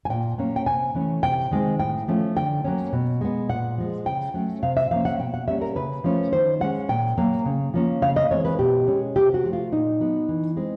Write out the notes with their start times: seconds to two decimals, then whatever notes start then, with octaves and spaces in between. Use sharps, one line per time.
0.05 G#5
0.09 A#2 G5
0.38 F#3 A#3 C#4
0.56 G5
0.66 C3 G#5
0.95 E3 A3 C#4
1.23 C3 G5
1.51 D#3 G#3 C4
1.79 A2 G5
2.08 F3 A3 C#4
2.36 D3 G5
2.64 F#3 A#3 C#4
2.93 B2
3.21 G#3 B3
3.49 A#2 F#5
3.78 F3 G#3
4.06 C#3 G5
4.34 F#3 A3 C#4
4.63 C3 F5
4.77 E5
4.91 F3 A#3 C#4 F5
5.05 F#5
5.19 B2 G5
5.34 F#5
5.48 G3 A#3 C#4 E5
5.61 A#4
5.76 C#3 B4
6.04 F3 A3 C#4
6.32 D#3 C5
6.61 G#3 C#4 F#5
6.89 A#2 G5
7.18 F#3 A#3
7.46 C#3
7.74 F3 A#3 C#4
8.02 C#3 F5
8.16 D#5
8.30 E3 G#3 C4 C#5
8.45 B4
8.59 B2 G4
8.87 G#3 C#4
9.16 C3 G4
9.34 F#4
9.44 F3 A3
9.53 F4
9.72 A#2 D#4
10.00 F#3 B3
10.29 E3
10.57 G#3 C4